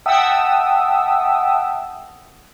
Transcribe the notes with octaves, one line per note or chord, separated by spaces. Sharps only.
E5 F#5 G5 A5 D#6 E6